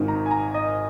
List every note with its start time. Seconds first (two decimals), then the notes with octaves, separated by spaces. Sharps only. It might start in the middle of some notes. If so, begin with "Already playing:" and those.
Already playing: G#1 G#2 D#3
0.08 A#5
0.26 G#5
0.31 A#5
0.54 D#5